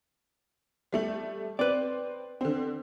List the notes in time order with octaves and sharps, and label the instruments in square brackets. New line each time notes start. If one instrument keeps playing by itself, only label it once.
[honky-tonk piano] G3 A3 F#7
[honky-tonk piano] C4 [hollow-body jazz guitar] B4 D5
[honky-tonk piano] D3 C4